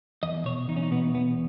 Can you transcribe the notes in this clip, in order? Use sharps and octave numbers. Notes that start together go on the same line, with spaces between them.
E2 D#5
B2 C#5
E2 D#4
C#4
D#4
B2 B3
E2 B3